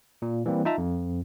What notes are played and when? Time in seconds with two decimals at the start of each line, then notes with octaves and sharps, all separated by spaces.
0.22 A#2
0.46 E3 G3 A#3 C4
0.65 D#4 F4 E5 A5 A#5
0.78 F2